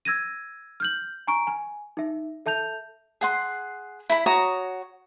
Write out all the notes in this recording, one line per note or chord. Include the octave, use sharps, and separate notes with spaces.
E6 G#6 A#6 D#7
F6 G6 F#7
G#5 A#5 C#6 D7
G#5
D#4 E5
A4 E5 A5 G6 F7
G#4 F#5 C6
E4 B5
F#4 C#5 A#5 D#6